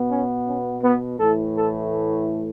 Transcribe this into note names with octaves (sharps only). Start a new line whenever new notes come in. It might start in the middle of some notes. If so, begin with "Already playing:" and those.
Already playing: B2 B3
C#4
C#4
B3
A2 E3 A3 A4
A4